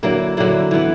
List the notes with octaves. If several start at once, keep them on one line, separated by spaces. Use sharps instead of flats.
D3 F#3 A#3 E4
D3 F#3 A#3 E4
E3 B3 E4